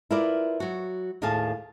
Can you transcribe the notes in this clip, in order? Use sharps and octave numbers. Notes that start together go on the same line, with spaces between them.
E4 F4 A#4 B4 D5
F#3 F#4
D#2 A2 A#3 G#4 F5 A5